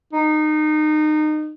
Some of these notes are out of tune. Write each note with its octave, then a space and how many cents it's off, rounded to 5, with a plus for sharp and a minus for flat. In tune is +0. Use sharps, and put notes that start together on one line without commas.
D#4 -25